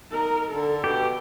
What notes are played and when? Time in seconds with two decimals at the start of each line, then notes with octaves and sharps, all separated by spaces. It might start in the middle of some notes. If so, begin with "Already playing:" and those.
0.11 D#4 A#4
0.51 D3 A4
0.84 B2 G4